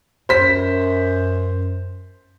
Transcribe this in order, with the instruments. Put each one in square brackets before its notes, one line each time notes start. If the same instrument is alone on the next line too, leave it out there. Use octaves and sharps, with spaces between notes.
[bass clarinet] F#2 [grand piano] C5 B6